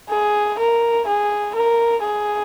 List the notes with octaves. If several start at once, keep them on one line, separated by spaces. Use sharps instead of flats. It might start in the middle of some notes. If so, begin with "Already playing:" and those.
G#4
A#4
G#4
A#4
G#4